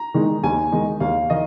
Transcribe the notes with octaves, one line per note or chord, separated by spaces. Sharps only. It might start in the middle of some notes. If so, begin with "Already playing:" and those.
Already playing: A#5
D#3 G#3 D#4
D#2 G#5
D#3 G#3 D#4
D#2 F5
D#3 D#5